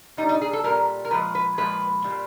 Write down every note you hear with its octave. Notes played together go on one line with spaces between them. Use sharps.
A#2 G3 D#4
D#4
G#4
A4
A#2 G3 A#4
A#4
A#2 F3 G#3 B4
B4
A#2 F3 G#3 B4
A#2 G3